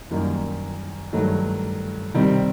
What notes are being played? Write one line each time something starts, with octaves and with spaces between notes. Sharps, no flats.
F#2 D#3 G3 A#3
G2 D#3 F#3 A3
C3 D#3 G3 C4